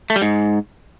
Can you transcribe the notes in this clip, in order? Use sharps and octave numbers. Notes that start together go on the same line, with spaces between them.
A3
G3
G#2